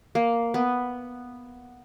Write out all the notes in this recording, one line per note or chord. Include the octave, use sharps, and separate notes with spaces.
A#3
B3